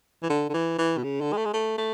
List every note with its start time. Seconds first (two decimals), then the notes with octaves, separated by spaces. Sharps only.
0.23 E3
0.30 D3
0.49 D3
0.54 E3
0.79 E3
0.97 B2
1.04 C#3
1.21 D3
1.32 G#3
1.37 A3
1.45 G#3
1.54 A3
1.78 A3